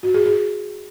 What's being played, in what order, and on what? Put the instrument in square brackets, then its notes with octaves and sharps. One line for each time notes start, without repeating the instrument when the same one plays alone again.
[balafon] F#4
G#4
G#4